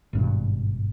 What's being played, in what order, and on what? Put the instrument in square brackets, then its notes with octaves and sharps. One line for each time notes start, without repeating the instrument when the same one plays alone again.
[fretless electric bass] G#1 G2 B2